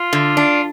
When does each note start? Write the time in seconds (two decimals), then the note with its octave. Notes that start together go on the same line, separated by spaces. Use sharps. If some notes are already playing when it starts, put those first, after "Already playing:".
Already playing: F4
0.13 D3
0.37 D4